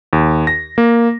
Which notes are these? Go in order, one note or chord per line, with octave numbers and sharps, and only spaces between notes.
D#2
A#6
A#3